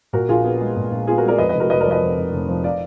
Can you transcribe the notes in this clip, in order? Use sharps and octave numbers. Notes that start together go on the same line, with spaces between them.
A#2 F#4 A#4
A#1 F4 G#4
B3
G#3
A#2
A#1
B3 F4 G#4
F#4 A#4
G#3
A#4 D5
F2 B4 D#5
B4 D#5
F1
F#4 A#4
F1 B4 D#5
F3 A#4 D5
B4 D#5
F2
F1
F1
F3
D5 F5